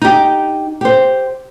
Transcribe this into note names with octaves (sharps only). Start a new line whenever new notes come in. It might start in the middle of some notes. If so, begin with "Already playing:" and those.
D#4 G4
G4 C5